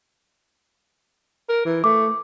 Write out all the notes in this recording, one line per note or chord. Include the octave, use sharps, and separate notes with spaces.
A#4
E3
A3 D6